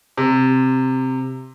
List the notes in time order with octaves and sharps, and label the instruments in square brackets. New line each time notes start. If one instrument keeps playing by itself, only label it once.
[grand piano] C3